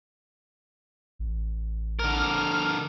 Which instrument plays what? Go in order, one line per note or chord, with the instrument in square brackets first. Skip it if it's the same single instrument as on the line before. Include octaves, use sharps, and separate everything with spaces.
[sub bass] A1
[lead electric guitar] D3 A#4 [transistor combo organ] F6